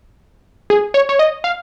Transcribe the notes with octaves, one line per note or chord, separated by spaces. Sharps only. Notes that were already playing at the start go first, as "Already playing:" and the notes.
G#4
C#5
C#5
D#5
F5